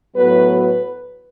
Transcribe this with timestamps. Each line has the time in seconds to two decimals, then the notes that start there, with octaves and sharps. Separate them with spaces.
0.14 A2 F#3 B3 B4
0.51 B4